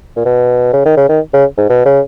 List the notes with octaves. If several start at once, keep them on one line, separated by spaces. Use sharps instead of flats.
A#2
B2
C#3
D#3
C#3
D#3
C#3
G#2
B2
C#3